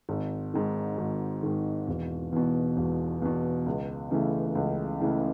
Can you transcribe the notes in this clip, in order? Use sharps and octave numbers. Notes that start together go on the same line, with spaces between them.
G#1
G#2 D#3
G#1
G#2 D#3
E1
E2 B2
E1
E2 B2
C#2
C#3 E3 A3
C#2
C#3 E3 A3